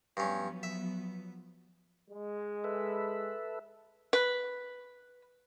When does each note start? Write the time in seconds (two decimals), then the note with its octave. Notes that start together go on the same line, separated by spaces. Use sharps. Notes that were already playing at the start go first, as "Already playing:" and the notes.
0.17 G2 F3 F#3 B3 C#4
0.63 E5
2.10 G#3
2.64 A4 B4 E5
4.13 B4